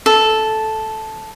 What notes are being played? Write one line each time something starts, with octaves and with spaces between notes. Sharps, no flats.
A4